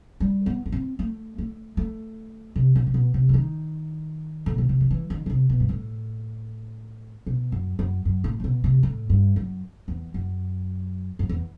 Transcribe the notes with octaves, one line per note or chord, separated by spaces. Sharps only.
G3
B3
B3
C4
A3
A3
A3
C3
B2
C3
B2
C3
E3
D#3
A2
B2
C3
D#3
E3
D#3
D#3
C3
B2
G2
A2
B2
F#2
F#2
F#2
A2
C3
B2
C3
A2
G2
F#2
E2
F#2
F#2
E2